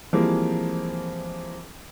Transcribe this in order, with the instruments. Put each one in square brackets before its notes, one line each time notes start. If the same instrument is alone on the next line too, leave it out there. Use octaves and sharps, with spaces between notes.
[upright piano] E3 F3 G3 G#3 A#3 C4